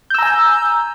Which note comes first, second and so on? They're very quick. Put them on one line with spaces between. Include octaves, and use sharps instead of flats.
G6 E6 A#5 G#5